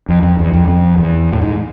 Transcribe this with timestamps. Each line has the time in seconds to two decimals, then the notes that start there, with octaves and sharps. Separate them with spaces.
0.09 F2
0.23 F2
0.39 E2
0.53 F2
0.68 F2
0.98 E2
1.33 A2
1.42 G#2